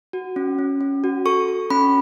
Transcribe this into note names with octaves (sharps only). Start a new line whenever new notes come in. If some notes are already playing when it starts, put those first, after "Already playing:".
F#4
C#4
C#4
C#4
F#4
A4 C#6
A4
C#4 B5